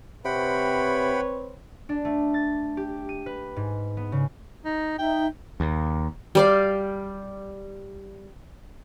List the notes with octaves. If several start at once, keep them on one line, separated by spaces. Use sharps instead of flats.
C3 C4 B4 C#5 F#5 G5 B5
D4
A3
A6
G4
D#7
B4
G#2
B3
C#3
D#4
D#4 E5 G5
D#2
G3 D5 F5